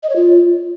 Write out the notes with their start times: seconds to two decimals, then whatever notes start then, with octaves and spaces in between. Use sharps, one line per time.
0.03 D#5
0.09 C#5
0.16 F4